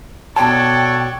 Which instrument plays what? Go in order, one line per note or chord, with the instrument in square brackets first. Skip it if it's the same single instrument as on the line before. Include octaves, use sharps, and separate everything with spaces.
[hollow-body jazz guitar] B2 A5 [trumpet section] A4 F#5 C#6 [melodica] C#5 D5 [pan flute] G5